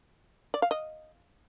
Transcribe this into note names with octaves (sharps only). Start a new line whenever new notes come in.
D5
F5
D#5